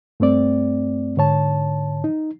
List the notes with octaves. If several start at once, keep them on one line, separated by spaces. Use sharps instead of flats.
G2 A3 C4 D5
G#2 D3 C#5 A5
D#4